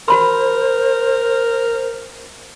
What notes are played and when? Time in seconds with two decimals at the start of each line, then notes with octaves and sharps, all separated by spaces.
0.08 F#4 A#4 C5 B5 C6